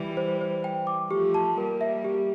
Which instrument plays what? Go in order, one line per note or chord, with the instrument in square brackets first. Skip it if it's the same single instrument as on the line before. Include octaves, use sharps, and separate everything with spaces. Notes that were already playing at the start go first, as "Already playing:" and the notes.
Already playing: [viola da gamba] E3 G3
[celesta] C5
C5
G5
D6
[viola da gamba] F3 A3 [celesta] G4
[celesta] A5
[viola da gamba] G3 A#3 [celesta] A#4
[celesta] E5
G4